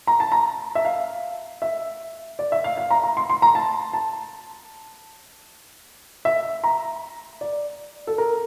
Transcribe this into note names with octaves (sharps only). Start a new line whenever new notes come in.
A#5
A5
A#5
E5
F5
E5
D5
E5
F5
F5
A#5
A#5
C6
C6
A#5
A5
A5
E5
A#5
D5
A4
A#4